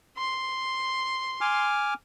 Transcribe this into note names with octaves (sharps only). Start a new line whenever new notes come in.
C6
G#5 D6 F6